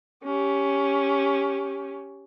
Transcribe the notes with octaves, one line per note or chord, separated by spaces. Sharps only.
C#4 G4